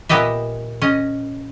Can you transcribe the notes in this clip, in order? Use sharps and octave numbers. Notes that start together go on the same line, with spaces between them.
A#2 B3 G4 D#5 E5
C#4 D#5